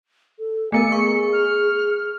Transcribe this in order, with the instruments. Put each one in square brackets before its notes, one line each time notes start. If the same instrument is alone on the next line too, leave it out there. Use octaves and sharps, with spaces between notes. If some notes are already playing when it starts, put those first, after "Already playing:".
[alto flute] A4
[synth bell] A3 B3 A#4 [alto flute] G#5 [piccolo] C#7
[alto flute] G#4 [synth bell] C#6
[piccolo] F6